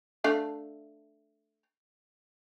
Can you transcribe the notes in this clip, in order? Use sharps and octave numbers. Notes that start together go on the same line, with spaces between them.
A3 D4 F5